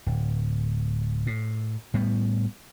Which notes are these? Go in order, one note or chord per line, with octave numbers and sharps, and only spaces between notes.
D1
A2
A2 G3 B3